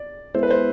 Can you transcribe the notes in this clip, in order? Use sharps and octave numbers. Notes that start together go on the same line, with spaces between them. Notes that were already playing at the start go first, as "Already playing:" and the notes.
Already playing: D5
G#3 B3 E4 C5
B4
C5